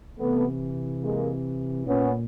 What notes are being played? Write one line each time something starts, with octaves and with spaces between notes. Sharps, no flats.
C3 E3 A3 B3
G#3 A#3
A#2 B3 C#4